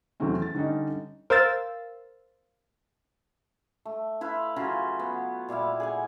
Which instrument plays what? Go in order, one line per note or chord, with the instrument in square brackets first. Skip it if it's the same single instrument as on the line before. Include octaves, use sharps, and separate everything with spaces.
[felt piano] E2 C3 F#3 A3 C4 C#4
A6
D3 G3 C#4 D#4
[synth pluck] A#4 C5 F5 E6 A6
[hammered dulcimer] A3
E4 B4 F5 C6
C#3 F#3 F4
B3
A#2 G3 E4 F5
G#4 F#5 G#5